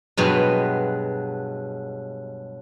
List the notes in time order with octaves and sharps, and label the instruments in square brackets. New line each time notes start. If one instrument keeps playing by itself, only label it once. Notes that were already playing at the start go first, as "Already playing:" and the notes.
[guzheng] G2 B2 F#3 G#3